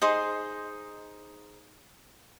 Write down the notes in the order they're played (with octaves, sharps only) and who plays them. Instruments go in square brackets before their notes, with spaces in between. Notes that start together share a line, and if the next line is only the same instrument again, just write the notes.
[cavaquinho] D#4 G#4 C5 C6